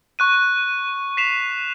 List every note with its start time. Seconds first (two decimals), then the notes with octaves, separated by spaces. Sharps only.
0.19 C#6 F#6 D#7
1.17 B6 C7 E7 F7